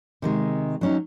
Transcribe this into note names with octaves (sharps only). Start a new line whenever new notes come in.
C3 D#3 G#3
F#3 C#4 D#4